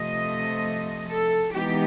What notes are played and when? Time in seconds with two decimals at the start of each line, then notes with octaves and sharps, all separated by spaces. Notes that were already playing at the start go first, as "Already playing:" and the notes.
Already playing: C3 F3 A3 D#5
1.09 A4
1.54 E3 G#3 B3 D#4 G4